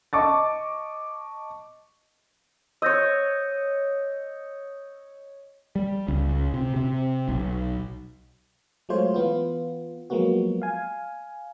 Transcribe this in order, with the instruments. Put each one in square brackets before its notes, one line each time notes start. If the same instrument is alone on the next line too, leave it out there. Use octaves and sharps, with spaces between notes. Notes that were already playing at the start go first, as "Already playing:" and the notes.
[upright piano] D#5 A5 C#6 D6 A6
[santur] C#5 D#5 [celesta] E6 G6 A#6
[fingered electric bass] G3
C#2
C3
C3
B1
[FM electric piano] F#3 G#3 A3 F4 C5 C#5
E3 B3 F4
F3 F#3 G#3 A#3 B3 F#4
F5 G#5